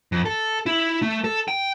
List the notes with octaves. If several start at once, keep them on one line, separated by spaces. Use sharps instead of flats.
F2
A4
E4
A3
A4
G5